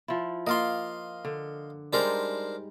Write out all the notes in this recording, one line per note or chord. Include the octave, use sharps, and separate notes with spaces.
F3 E4
A#3 F4 D#5 F5 C6
D3
G3 G#3 D4 D#4 A#4 C5